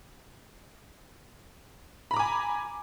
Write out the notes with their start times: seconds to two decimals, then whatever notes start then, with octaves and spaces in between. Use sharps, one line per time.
2.11 B5
2.14 A#5
2.17 D6
2.19 G#5